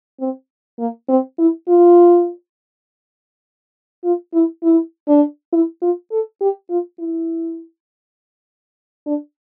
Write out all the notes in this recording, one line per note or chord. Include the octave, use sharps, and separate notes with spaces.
C4
A#3
C4
E4
F4
F4
E4
E4
D4
E4
F4
A4
G4
F4
E4
D4